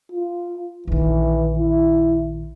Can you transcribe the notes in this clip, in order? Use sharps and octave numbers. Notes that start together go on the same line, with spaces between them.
F4
A#1 D#3 E3
E4